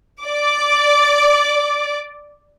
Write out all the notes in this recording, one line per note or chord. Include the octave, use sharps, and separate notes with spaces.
D5 D6